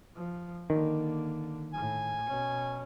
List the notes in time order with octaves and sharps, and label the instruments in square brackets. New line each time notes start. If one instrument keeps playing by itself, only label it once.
[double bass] F3
[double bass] D3 A#3 [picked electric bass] D#3
[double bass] A2 [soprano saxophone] G#5
[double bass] B2 C#4